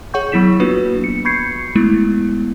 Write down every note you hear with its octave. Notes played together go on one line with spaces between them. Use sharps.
G#4 C#5 F#5 C#6 G6
F#3 B3 E4 B6 E7
A#3 B3 D4 F4 F#4 B4
C#7
B5 C#6 G6 G#6 C7 C#7
G#3 A3 B3 E4